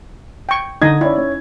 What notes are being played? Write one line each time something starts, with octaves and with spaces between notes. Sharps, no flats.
G5 C#6
D3 D#4 D#5 G#6
C#4 E4 D5
C#4